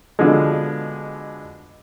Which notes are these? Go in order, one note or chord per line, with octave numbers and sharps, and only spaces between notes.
B2 D3 F3 G#3